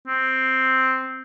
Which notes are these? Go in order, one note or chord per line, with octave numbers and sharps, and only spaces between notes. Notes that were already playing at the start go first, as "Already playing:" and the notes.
C4